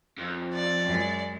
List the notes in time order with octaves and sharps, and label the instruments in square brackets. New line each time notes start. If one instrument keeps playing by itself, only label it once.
[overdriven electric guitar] F2
[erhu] D5
[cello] F#2 G#3